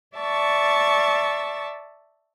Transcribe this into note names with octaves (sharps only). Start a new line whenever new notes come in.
D5 E5 A5 C#6